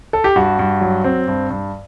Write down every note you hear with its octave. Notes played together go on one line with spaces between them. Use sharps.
A4
G4
G2 F#4
G2
F#3
C4
G2
G2